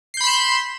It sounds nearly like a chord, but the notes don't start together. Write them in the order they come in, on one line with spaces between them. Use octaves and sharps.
C7 G6 B5 C6 E7